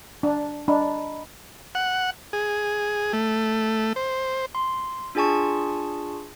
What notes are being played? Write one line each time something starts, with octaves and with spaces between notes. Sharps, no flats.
D4
D4 D#5 A#5 B5
F#5
G#4
A3
C5
C6
D4 F4 G#4 G#5 A5 C#6